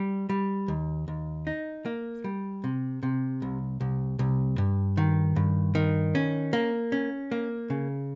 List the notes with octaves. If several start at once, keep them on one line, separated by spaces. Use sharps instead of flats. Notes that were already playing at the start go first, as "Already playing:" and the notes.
Already playing: G3
G3
D#2
D#2
D#4
A#3
G3
C3
C3
C2
C2
C2
G2
D#3
G2
D#3
C#4
A#3
C#4
A#3
C#3